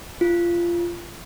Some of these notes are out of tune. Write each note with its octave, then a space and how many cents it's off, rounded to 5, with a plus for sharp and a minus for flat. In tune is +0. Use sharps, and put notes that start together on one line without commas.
F4 -20